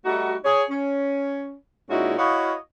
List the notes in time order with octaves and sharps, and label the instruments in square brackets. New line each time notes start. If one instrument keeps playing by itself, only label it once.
[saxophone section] G3 A3 D#4 F#4
G#4 C#5
C#4
A#2 G#3 C#4 D#4 E4 F#4
E4 F#4 C#5 D#5 F5